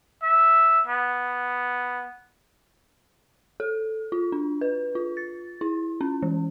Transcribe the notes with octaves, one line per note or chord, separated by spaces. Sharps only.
E5
B3
A4
F4
D4
B4
F4
A6
E4
C#4
E3